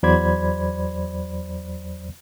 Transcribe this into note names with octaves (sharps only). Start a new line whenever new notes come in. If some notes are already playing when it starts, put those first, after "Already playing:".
E2 F#3 C5 D5 B5 G#6